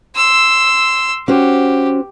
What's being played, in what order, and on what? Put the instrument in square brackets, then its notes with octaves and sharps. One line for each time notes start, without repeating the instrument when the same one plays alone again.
[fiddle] C6 E6
[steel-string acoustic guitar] C#4 F#4 C5 [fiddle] G4